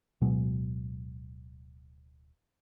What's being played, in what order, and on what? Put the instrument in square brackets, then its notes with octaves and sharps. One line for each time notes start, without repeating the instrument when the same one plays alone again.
[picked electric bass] D1 B2 F#3 G#3